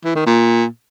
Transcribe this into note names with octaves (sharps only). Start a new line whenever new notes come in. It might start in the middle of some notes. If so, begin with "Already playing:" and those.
E3
D#3
A#2